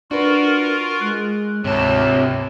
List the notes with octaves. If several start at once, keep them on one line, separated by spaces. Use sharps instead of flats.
D4 F4 F#4 A#4 B4
G#3 F#6
D2 G#2 C3 C#5 A5